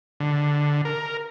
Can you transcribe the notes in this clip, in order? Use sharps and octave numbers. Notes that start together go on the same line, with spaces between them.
D3
A#4